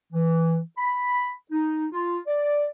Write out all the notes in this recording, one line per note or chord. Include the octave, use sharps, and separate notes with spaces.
E3
B5
D#4
F4
D5